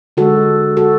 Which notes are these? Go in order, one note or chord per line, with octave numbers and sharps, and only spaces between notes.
D3 G#3 F#4 A4
F#4 A4